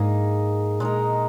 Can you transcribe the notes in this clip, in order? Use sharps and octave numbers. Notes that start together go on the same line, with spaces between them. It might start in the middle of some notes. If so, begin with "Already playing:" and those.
Already playing: G#2 A#3 D#4 G#4
A#2 G#3 D#4 A#4